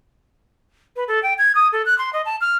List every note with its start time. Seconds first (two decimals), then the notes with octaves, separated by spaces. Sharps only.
0.96 B4
1.08 A4
1.23 G5
1.38 G#6
1.55 D#6
1.73 A4
1.86 F#6
1.98 C6
2.13 D#5
2.25 A5
2.41 F6